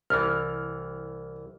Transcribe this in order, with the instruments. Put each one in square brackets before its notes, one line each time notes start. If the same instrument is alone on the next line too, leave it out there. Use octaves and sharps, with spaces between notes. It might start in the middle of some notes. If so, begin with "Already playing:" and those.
[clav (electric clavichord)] C2 E3 [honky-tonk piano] F6